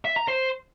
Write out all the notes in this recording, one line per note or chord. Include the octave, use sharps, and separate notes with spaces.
E5
A#5
C5